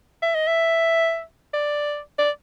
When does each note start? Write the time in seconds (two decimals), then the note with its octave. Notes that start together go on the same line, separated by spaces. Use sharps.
0.22 E5
0.35 D#5
0.47 E5
1.54 D5
2.19 D5